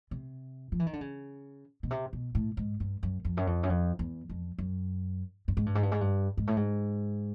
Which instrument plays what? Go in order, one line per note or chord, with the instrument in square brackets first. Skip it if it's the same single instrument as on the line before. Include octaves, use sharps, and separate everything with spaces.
[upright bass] C3
F3
E3
D#3
D3
C#3
B2
C3
B2
A2
G#2
G2
F#2
F2
F#2
F2
F#2
F2
E2
F2
F#2
G2
G#2
G2
G#2
G2
G#2
G2
G#2
A2
G#2